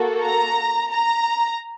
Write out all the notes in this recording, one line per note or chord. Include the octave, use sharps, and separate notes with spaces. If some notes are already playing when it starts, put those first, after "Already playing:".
Already playing: A#3 F#4 A4
A#5
A#5